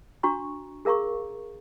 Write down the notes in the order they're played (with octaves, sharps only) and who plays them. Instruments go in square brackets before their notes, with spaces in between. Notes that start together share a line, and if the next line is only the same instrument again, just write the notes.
[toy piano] D4 F#4 A#5 C#6
G#4 A#4 F5 A#5 C#6